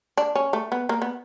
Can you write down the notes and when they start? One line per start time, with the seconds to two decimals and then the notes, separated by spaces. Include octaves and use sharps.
0.17 D4
0.35 C#4
0.53 A3
0.72 B3
0.89 A#3
1.02 B3